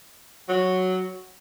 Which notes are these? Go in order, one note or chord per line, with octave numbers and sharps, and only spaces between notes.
F#3